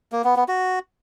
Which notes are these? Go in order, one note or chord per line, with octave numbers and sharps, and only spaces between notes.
A#3
B3
B3
F#4